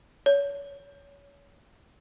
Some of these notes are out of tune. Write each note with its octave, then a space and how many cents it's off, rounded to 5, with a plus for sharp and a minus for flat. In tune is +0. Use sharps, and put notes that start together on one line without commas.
C#5 +25